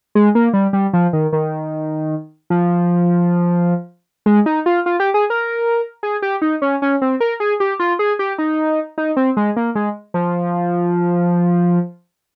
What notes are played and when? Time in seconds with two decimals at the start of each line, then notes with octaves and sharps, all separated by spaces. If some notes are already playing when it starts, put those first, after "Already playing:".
0.15 G#3
0.35 A#3
0.53 G3
0.73 G3
0.93 F3
1.13 D#3
1.33 D#3
2.50 F3
4.26 G#3
4.46 D#4
4.66 F4
4.86 F4
5.00 G4
5.14 G#4
5.30 A#4
6.03 G#4
6.22 G4
6.42 D#4
6.62 C#4
6.82 C#4
7.02 C4
7.20 A#4
7.40 G#4
7.60 G4
7.80 F4
7.99 G#4
8.19 G4
8.38 D#4
8.98 D#4
9.17 C4
9.37 G#3
9.56 A#3
9.75 G#3
10.14 F3